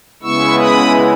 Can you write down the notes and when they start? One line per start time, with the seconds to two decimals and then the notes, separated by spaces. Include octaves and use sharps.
0.22 C#3 G#3 B3 E4 C#6 E6
0.59 B5 D#6